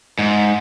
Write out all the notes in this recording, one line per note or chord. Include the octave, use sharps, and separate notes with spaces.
G#2